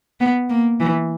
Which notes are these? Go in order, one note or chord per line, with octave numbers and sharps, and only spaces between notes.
B3
A#3
E3